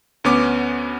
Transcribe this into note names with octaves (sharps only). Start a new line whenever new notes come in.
D2 B3 C#4 D6